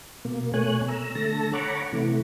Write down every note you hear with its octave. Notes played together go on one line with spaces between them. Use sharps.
B2 A#3
B2 A3 C#5 G#5 F#6
A#5 E6
D3 A3 A4 A5 A#6
C#5 F#5 A#5 B5 C#6 D6
C3 E3 A3